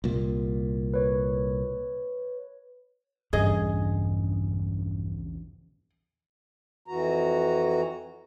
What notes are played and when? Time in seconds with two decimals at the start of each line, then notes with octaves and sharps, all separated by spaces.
0.04 C2 A#2
0.94 B4 C#5
3.33 A#1 E2 G2 C#3 G#4 D#5
6.88 F2 E3 F#4 A#5